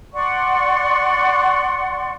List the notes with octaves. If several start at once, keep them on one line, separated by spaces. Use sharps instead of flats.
D5 F#5 C6 C#6